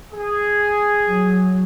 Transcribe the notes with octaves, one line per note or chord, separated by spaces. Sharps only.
G#4
F#3